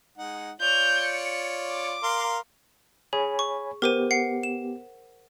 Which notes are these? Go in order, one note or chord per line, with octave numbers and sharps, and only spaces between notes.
G#3 D#4 F#5
F4 C#5 D5 G6 F7
C#7
D6
A#4 F5 C6
G#4 C#5 G#5 B5
C#6
B3 G4 A#4 C5 D#7
F#5 C7
E7